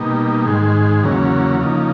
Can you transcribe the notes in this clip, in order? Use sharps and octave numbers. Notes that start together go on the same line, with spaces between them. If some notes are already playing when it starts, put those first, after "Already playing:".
Already playing: B2 G3 A#3 D#4
G#2 D#3 G#3
E2 C#3 F#3 A#3 C#4
C#3 F3 A#3 D#4